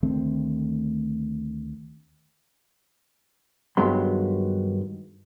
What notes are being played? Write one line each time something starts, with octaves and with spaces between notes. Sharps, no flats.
D2 D#3 A3 C4
G2 D#3 F#3 G#3 B3 C6